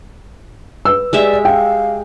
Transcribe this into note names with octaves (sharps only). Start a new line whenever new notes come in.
B4 E6
G#3 G4 D5 E5
F5 G5